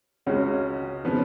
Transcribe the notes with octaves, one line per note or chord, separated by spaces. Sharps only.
C#2 C#3 G#3 C#4 F#4
C#3 F3 B3 D#4